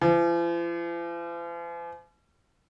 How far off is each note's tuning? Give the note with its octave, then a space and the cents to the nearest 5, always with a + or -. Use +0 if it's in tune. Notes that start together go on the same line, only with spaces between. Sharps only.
F3 -45